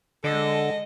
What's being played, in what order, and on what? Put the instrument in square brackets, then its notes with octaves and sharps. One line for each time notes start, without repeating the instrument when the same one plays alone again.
[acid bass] D3 [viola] G#3 D#5 [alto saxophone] A4